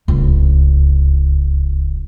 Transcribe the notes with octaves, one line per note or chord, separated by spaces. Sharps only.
D1 C#2